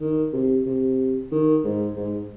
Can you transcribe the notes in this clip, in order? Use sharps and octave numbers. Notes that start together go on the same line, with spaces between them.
D#3
C3
C3
D#3
G#2
G#2